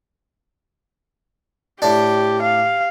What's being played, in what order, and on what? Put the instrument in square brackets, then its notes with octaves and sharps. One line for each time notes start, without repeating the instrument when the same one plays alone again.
[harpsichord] A2 D4 [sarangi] G4
[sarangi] F5